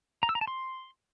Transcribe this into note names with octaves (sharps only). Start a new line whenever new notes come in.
A#5
E6
A#5
A5
C6